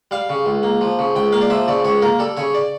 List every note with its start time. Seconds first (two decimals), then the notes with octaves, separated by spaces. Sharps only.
0.11 G3 F5
0.30 C#3
0.46 C#2
0.63 A#3
0.81 F3
0.99 C#3
1.16 C#2 G5
1.33 A#3 F5
1.41 D5
1.50 F3 E5
1.68 C#3 D5
1.84 C#2 C#5
2.02 A#3 A#4
2.19 G3 A4
2.37 C#3 C#5
2.54 D5